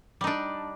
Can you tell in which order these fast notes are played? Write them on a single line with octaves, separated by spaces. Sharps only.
G3 D#4 D4